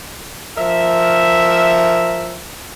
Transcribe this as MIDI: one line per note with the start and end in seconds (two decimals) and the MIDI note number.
0.57 2.42 53
0.57 2.42 70
0.57 2.42 76